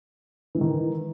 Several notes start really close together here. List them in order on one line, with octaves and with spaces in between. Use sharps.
E3 G#3 D#3